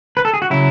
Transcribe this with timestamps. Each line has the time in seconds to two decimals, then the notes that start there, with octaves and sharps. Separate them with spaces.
0.17 B4
0.25 A4
0.34 G#4
0.42 F#4
0.50 C#3 F#3 E4